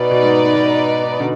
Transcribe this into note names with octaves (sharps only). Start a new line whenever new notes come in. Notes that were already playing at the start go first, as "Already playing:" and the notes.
Already playing: B2 D#4 B4 D5
B2
G#2
G#2
B2
B2 D3